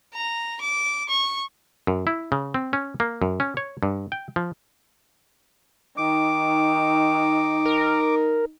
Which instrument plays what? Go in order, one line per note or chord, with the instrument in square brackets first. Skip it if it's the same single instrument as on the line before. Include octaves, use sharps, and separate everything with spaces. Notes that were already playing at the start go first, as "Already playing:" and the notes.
[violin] A#5
D6
C#6
[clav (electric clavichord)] F#2
E4
C#3
C4
C#4
A#3
F#2
C#4
C#5
G2
G5
F3
[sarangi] D#3 [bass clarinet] D#4 [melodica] D6
[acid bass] A#4